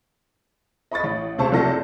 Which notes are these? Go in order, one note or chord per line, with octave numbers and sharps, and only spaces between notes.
D#5 B5 C#6 A6
A1
C#2 C3 C5 A5 C#6
F#1 C3 F3 A4 D5 A#6